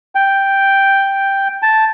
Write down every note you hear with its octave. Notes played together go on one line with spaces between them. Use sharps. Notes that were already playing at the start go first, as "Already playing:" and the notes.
G5
A5